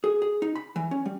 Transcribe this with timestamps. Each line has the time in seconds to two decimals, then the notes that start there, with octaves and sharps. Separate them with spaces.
0.04 G#4
0.22 G#4
0.42 D#4
0.56 B5
0.76 E3
0.91 C#4
1.06 G3